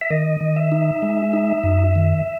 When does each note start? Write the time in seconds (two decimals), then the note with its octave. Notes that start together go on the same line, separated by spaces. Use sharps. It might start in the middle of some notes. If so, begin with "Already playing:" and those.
0.01 E5
0.10 D#3 D#5
0.41 D#3
0.56 E5
0.72 D#4
1.02 G#3
1.33 D#4
1.63 F#2
1.95 D#3